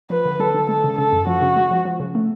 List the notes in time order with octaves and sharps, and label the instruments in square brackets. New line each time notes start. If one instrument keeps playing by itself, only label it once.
[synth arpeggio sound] F3 [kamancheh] B4
[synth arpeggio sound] D3
[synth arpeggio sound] F#3 [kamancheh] A4
[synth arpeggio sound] D3
[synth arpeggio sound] G#3 [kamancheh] A4
[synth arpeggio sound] C#3
[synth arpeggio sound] C#3 [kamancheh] A4
[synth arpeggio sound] F#2
[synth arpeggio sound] F3 [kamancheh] F#4
[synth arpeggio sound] C#3
G#3
F3
F3
C#3
A3